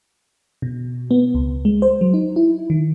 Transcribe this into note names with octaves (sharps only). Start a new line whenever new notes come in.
B2
B3
C#2
G#3
C5
F#3
D#4
E4
D#3